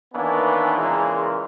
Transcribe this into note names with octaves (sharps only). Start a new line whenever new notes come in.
D#3 E3 A#3 B3 C#4 D4
A#2 C#3 E3 G#3 A#3 F4